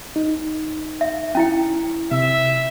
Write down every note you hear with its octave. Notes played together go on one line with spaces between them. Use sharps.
D#4
E5
C#4 E4 G5
C3 E5